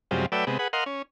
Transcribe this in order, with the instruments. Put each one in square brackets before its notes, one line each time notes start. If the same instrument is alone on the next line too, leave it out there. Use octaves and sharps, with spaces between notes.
[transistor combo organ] F#2 C3 F3 G3 G#3
F#3 A3 B4 D5 G5 E6
C3 G#3 B3
G#4 B4 F#5
A#4 D#5 F5 F#5 C6
C#4